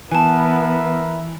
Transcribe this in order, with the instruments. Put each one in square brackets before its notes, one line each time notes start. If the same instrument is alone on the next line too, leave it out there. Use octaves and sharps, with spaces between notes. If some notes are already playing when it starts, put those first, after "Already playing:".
[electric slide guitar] E3 [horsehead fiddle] B3 [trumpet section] A#4 B4 E5 [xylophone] G#5 A5